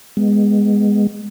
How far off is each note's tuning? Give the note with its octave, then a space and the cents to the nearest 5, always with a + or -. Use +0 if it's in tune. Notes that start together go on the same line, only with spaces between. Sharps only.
G#3 -10 B3 +0